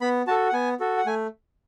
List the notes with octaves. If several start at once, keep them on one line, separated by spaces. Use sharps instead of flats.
B3 B5
F#4 A4 A5
F#5
B3 G#5
F#4 A4
F#5
A3 G#5